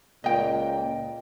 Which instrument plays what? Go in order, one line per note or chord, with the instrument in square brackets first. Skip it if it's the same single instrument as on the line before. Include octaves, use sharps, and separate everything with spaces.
[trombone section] C#2 A#2 [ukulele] D#5 G5